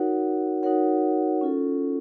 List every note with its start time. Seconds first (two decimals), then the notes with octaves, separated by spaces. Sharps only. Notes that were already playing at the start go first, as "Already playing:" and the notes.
Already playing: D#4 F#4 A#4 C#5 F#5
0.63 D#4 F#4 A#4 C#5 F#5
1.41 C#4 F4 A4